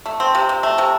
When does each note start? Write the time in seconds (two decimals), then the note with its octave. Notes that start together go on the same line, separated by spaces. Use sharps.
0.06 A3
0.20 C4
0.35 C3
0.49 C3
0.63 A3
0.78 C3